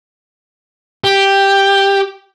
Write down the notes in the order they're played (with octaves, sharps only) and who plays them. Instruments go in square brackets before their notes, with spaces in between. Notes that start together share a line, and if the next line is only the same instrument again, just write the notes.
[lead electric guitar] G4